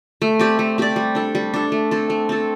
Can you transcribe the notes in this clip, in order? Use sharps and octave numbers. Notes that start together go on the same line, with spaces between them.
A3
C4 G4 D5
A3
C4 G4 D5
G3
D4 A4
G3
D4 A4
A3
C4 A4
A3
C4 A4